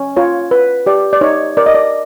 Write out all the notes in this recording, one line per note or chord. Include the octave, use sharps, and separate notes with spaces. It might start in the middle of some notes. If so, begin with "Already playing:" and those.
Already playing: C#4
F4 C#5
B4
G4 D5
D5
D#4 C#5
A#4 D5
D#5
D5